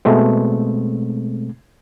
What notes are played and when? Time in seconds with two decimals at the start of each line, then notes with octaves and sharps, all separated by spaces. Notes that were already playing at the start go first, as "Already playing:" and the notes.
0.05 B2 G#3 A3 C4